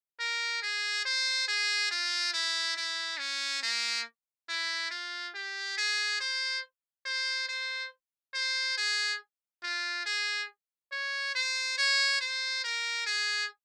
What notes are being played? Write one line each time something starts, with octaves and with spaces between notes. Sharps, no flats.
A#4
G#4
C5
G#4
F4
E4
E4
C#4
A#3
E4
F4
G4
G#4
C5
C5
C5
C5
G#4
F4
G#4
C#5
C5
C#5
C5
A#4
G#4